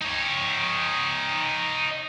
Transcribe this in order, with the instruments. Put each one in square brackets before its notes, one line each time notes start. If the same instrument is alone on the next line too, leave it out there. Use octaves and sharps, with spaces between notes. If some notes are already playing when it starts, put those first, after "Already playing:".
[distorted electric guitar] D#4 C#5